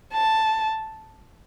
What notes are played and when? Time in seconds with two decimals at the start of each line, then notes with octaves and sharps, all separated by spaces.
0.13 A5